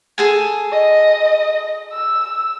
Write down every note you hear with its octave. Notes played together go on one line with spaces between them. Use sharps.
G#4 A4 G#5
D#5
E6